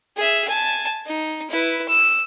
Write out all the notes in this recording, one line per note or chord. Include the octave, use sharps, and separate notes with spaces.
G#4 E5
G#5 A5
D#4
E4 B4
E6